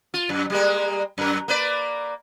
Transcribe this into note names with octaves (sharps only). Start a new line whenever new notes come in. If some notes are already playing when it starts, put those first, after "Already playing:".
F4
F#2
G3 G#3 A#3
F#2 A#4
A#3 B4 D5